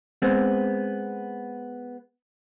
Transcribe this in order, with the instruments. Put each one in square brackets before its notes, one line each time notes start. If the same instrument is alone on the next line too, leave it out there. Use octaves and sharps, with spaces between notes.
[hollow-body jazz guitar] G#3 B3 C4